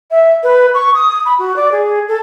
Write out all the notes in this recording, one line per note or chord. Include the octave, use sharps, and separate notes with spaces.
E5
B4
C#6
D#6
B5
F#4
D5
G#4
A4